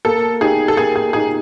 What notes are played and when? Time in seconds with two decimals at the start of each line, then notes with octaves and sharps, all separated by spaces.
0.05 A#3 A4
0.41 D#4 G4 G#4
0.68 A4
0.77 A#3 G#4
0.96 G#4
1.13 D#4 G4 G#4